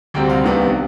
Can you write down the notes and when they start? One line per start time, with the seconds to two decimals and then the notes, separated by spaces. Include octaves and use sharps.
0.14 D2 C3 G3 C4 G5
0.29 F5
0.44 C2 C3 D#3 B3 D4